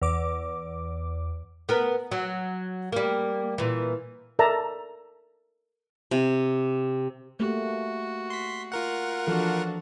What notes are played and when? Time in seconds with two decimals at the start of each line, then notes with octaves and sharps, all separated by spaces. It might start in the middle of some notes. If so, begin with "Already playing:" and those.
0.02 E2 D6
1.69 B3 A#4
2.12 F#3
2.92 G3 A#3
3.58 A#2 E3
4.39 A4 A#4 D5 E5 A5 A#5
6.11 C3
7.40 A3 A#3 F#4 G4
8.30 C6 B6
8.72 F4 A#4 F#5
9.27 E3 F3 D4 F#4 A4